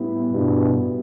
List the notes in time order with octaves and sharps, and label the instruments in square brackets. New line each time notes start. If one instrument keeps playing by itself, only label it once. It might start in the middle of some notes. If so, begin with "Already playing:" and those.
Already playing: [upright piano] A2 G3 B3 E4
[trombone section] G2 B2